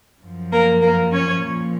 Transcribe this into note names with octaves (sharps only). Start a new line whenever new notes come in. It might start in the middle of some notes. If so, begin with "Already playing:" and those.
F#2 F3
A#3 A#4
A#3 A#4
C#4 C#5
A#2 F3